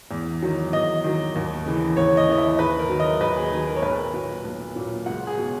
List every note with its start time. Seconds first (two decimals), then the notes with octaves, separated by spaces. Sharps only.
0.11 E2
0.42 D#3 F#3
0.72 E2 D#5
1.04 D#3 F#3
1.35 D#2
1.66 C#3 E3
1.96 D#2 C#5
2.17 D#5
2.28 C#3 E3 D#5
2.38 E5
2.59 D#2 B4
2.79 A#4
2.90 D#3 F#3
3.00 D#5
3.20 D#2 B4
3.37 G#4
3.51 D#3 F#3 G#4
3.67 A#4
3.76 C#5
3.82 B1 B4
4.14 A#2 F#3
4.44 B1
4.76 A#2 F#3
5.06 C#2 F#5
5.27 G#4
5.37 B2 F#3